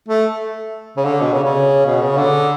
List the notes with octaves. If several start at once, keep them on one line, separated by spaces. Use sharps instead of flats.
A3
C#3
D3
B2
C#3
C#3
B2
C#3
D3